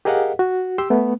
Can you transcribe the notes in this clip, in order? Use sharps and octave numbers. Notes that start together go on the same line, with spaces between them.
G4 G#4 A#4 D#5 F5 F#5
F#4
G4 C6 E6
A3 B3